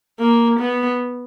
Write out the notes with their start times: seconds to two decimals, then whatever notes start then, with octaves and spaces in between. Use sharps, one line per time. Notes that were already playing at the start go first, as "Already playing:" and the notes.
0.20 A#3
0.60 B3